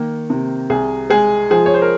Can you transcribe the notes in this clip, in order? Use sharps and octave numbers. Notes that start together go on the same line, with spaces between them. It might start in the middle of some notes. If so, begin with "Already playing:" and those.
Already playing: D#3 A#3
C3
C2 G#4
G#3 G#4
F3 G#4
C#5
C5
A#4